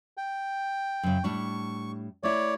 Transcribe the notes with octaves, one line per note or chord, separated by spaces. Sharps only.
G5
F#2 C#3
A2 G3 D4 C#6
A3 E4 C#5 D5